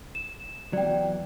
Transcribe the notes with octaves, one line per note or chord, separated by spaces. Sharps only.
E7
E2 F#3 D5 G5